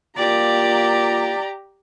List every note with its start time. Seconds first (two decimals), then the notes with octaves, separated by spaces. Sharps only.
0.17 A#3 F4 G4 D5 A#5